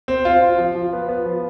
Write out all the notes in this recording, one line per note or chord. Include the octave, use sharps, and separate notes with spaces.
C4
F4
F4
F3
F3
B3
B3
F3